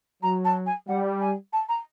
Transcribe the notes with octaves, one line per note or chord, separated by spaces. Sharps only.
F#3 A#5
A5
G#5
G3 F#5
G#5
A5
A#5